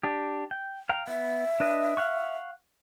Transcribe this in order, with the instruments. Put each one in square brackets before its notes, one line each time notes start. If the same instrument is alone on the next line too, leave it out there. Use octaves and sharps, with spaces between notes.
[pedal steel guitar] D4 G4
G5
F5 G5 A#5
[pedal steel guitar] B3 [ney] E5
[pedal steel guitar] D4 B4 D#5
F5 F#5 C#6